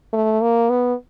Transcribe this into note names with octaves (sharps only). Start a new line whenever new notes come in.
A3
A#3
B3